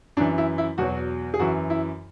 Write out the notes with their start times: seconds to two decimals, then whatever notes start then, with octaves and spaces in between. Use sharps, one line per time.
0.17 F#2 D4
0.20 E3
0.38 E4
0.58 E4
0.78 E2 B2 F#3 F#4
1.34 G#4
1.39 F#2 E3 F#4
1.70 E4